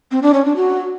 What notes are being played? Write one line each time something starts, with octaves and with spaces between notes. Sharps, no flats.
C4
D4
C#4
D4
F#4